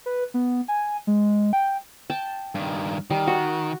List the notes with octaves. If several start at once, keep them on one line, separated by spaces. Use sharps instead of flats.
B4
B3
G#5
G#3
G5
G5 A5
G2 D#3
D#3 G3
F#4